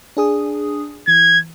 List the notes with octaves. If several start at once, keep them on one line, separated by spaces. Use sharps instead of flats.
D4 G#4 D#6
E3 G#6